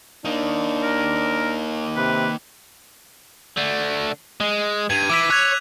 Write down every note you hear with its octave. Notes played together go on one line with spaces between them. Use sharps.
A#3 D4 D#4
A#4
C3 B4
D3 A3
G#3
G2 G#6 D#7
E3 D6 E6 B6
C#5 F#6 G#6 F7